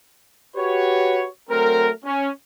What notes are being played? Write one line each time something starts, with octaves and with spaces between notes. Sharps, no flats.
F#4 G4 B4 C#5
F#3 A3 C4 A#4
C#4